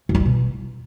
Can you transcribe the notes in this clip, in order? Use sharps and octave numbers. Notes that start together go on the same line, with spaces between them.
F#2
F3
G3
B2